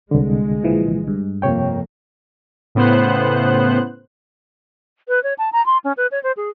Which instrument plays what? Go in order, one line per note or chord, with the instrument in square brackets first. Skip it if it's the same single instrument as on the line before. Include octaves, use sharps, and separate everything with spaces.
[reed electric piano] C2 D3 [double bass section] G#3
[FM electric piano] A#2 E3 F3
G2
[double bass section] F2 A#3 [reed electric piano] C3 C#5 G5
[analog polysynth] A2 C#3 B3 C5 F#6
[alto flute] B4
C#5
A5
A#5
C6
C#4
B4
C#5
C5
G#4